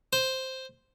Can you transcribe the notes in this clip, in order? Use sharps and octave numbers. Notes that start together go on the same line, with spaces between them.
C5